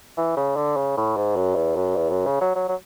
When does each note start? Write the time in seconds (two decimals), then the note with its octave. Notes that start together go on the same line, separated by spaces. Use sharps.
0.17 E3
0.36 C#3
0.56 D3
0.77 C#3
0.97 A2
1.17 G#2
1.36 F#2
1.55 E2
1.76 F#2
1.96 E2
2.10 F#2
2.26 C#3
2.41 F#3
2.55 F#3
2.68 F#3